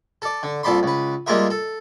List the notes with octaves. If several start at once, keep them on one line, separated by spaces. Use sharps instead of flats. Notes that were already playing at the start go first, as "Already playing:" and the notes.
A4 D5
D3
C2 A#2 A4 D5 B5 C6
C#2 B4
G3 G#3 A#3 F4 A#4 E5
A4